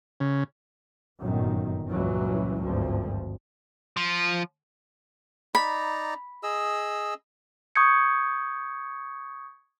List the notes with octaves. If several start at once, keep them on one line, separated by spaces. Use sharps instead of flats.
C#3
G1 F#2 A#2 D#3
C#2 G2 A#2 E3 F#3 C#4
G#1 D2 G2 F3
F3
D#4 D5 A#5 B5
G#4 D#5 E6
C#6 D#6 G6 G#6 C#7